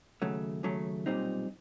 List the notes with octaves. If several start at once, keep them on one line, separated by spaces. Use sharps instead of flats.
D#2 C#3 F#3 A3
D#2 C#3 F#3 A3
B1 A#2 G3 C4 D#4